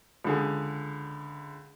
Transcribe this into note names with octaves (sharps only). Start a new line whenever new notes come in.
C#2 D3 G#4